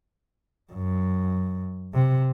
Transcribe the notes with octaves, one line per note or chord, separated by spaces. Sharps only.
F#2
C3